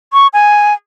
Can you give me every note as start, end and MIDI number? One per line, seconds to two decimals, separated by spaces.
0.13 0.27 85
0.33 0.74 80